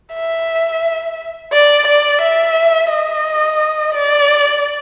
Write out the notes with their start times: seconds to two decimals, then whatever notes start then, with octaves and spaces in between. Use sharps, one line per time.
0.14 E5
1.52 D5
1.87 D5
2.21 E5
2.90 D#5
3.94 D5